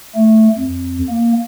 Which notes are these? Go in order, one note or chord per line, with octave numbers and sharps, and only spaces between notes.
A3
F2
A#3